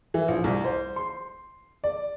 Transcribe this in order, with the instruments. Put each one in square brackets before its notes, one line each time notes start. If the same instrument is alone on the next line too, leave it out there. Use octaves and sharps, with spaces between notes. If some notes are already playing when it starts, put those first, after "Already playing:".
[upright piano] E3
A#1
C2
C5
C6
D5